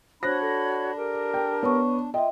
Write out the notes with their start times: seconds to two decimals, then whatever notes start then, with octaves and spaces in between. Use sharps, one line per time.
0.23 D4 F#4 C5 C#5 B5 F#6 A#6
0.42 A4
0.96 G4 A#4
1.34 G5
1.63 B3 C#5 A5 C#6
2.14 F4 D#5 E5 G5